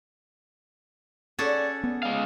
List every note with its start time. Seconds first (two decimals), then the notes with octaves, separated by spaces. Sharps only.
1.39 C#4 F#4 G#4 A4 D5
1.84 B3
2.03 G#3 F5